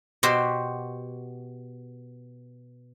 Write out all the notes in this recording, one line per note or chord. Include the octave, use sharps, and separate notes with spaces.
B2 F#4 G4 C5